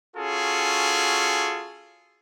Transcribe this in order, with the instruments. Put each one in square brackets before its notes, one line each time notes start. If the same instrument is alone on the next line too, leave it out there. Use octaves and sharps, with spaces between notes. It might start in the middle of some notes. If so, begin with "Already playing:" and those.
[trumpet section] C#4 F4 F#4 G#4 A4